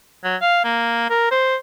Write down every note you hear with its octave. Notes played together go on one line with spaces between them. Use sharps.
F#3
F5
A#3
A#4
C5